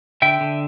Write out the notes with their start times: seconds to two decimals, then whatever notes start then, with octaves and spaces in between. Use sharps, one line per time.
0.22 D3 E5 G5
0.41 D3